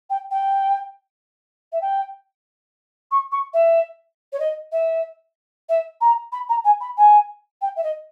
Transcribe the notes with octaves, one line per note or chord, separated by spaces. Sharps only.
G5
G5
E5
G5
C#6
C#6
E5
C#5
D#5
E5
E5
A#5
B5
A#5
G#5
B5
G#5
G5
E5
D#5